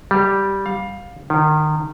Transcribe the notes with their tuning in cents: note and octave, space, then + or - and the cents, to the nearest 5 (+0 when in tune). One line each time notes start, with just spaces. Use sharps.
G3 -5
F5 +20
D#3 -25